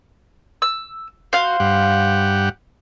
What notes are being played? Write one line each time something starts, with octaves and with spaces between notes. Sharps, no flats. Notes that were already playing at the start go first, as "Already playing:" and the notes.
E6
F#4 C5 F5
G2 G4 F#5